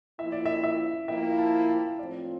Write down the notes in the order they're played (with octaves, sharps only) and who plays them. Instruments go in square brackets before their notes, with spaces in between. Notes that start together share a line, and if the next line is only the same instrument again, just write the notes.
[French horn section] F3 A#3 E4 [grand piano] E5
[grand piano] D5
E5
E5
[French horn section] F3 A#3 E4 [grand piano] E5 G5
[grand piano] F5 A5
G5
F5 A5
[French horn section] A2 F3 C4 F4 [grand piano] D5